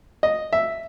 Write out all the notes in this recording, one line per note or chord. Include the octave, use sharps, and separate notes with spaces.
D#5
E5